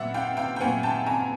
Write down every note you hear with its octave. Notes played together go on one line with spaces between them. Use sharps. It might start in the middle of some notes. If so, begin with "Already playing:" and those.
Already playing: A#2 F#3 B3 E5 F#5
F5 G5
F5 G5
G5
A#2 F#3 B3 F#5 G#5
G5 A5
G#5 A#5